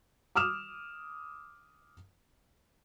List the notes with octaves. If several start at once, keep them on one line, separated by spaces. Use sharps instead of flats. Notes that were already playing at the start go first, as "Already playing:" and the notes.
D6 D#6 F6 E7